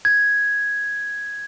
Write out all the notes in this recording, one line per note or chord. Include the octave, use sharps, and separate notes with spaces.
G#6